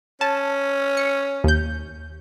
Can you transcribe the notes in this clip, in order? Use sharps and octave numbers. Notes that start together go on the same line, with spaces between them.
C#4 A5
C#7
D#2 G6